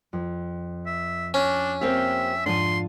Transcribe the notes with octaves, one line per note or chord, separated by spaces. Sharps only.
F2
E5
C#4 D4
A#3 C4 G4 E5 F6
G#2 F3 D4 F4 C6 D#7